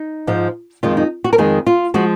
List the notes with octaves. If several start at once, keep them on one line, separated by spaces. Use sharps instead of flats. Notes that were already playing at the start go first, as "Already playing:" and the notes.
Already playing: D#4
G#2 F3 G#3
F2 D#3 G#3 F4
D#4
F#4
A#4
F2 D#3 G#3 G#4
F4
F3 G#3 F#4